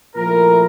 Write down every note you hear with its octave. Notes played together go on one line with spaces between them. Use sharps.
A#2 F3 A3 E4 A#4